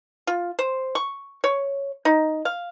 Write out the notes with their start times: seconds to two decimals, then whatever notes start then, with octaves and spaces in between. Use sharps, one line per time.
0.27 F4
0.59 C5
0.95 C#6
1.44 C#5
2.05 D#4
2.45 F5